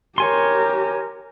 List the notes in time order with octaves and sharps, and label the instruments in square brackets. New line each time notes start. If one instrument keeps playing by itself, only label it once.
[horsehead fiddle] G4 A#4 [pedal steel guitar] C#5 G#5 C6